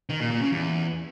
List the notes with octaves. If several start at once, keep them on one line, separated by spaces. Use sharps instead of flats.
D#3
A#2
A#2
C#3
E2